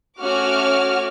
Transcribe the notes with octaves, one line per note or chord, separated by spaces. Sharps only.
A3 C#4 F#4 D6 F6